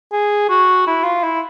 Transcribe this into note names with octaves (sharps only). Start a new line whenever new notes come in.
G#4
F#4
E4
F4
E4